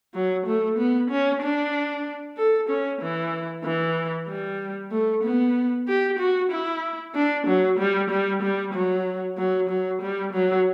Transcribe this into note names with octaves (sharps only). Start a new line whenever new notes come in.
F#3
A3
B3
C#4
D4
A4
C#4
E3
E3
G3
A3
B3
G4
F#4
E4
D4
F#3
G3
G3
G3
F#3
F#3
F#3
G3
F#3